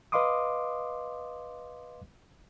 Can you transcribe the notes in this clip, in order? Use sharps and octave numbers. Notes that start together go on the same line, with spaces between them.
B4 D#5 F5 C6 D6 D#6